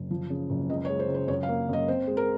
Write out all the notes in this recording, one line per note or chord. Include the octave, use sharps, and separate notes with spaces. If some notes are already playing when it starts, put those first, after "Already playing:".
Already playing: F#1
F3
C#3
F#1
C#2 D#5
C#5
G#3
C5
C#2
C5
F#2 C#5
F5
A#3
F#2 D#5
C4 C5
G#3
A#4